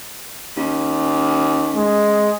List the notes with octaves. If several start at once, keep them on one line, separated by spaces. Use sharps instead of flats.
D#2 C#4
G#3